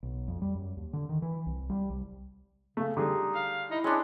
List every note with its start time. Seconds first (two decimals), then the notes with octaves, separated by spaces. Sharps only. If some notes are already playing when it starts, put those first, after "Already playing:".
0.03 B1
0.28 F2
0.42 G3
0.55 F#2
0.77 D#2
0.93 D3
1.09 D#3
1.22 E3
1.46 C2
1.70 G3
1.90 C2
2.77 C#3 A3
2.97 D3 G3 D#4 G#4
3.35 F5
3.71 D#4 E4
3.84 G#3 C#4 D4